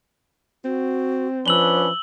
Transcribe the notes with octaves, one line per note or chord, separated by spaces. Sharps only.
C4 F#4
F3 C#4 D4 B4 E6 F#7 G7